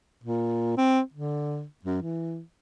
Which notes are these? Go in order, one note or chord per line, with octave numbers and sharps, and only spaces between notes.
A#2
C4
D3
F#2
E3